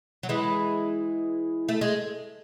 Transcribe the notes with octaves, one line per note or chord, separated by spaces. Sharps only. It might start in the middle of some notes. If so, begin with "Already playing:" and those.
F#3
E3 G#3
A3
G#3